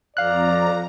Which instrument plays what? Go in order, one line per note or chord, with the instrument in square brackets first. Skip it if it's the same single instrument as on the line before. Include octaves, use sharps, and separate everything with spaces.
[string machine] F2 A#5 [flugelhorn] D5 [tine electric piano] F5 F#6